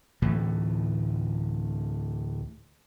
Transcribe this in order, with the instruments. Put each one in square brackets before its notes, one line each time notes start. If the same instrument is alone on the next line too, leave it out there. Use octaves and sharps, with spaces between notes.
[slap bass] D2 A2 E3 A3